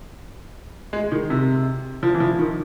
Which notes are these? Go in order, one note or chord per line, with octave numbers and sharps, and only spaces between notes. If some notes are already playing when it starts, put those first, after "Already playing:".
G#3
D#3
C3
F3
E3
F3
D#3